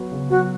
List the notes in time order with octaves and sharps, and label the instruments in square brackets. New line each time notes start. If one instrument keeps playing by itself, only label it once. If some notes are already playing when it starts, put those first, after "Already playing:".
Already playing: [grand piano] F#3 B3 F#4
C#3
[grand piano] F#3 [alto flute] F#4